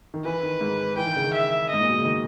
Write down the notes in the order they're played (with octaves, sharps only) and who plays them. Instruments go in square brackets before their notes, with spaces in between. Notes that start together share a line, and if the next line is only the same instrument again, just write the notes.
[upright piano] D#3
[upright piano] E3 [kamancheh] B4
[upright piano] D#3
G#2
[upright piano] E3 [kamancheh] G5
[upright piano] D#3
C#3
D#3
[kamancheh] E5
[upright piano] G#2 [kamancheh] D#5
[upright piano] A#2
B2
C#3
D#3